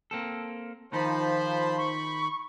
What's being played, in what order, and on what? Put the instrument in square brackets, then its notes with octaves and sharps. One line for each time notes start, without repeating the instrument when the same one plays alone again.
[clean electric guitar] A#3 C4 A4
[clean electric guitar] D#3 D#4 [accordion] F3 A5 B5 [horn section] F4 C5
[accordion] B5 [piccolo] C#6